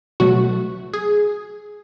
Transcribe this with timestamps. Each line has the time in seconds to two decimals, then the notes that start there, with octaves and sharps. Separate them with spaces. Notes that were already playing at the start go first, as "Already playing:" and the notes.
0.20 B2 F#3 A3 F#4
0.94 G#4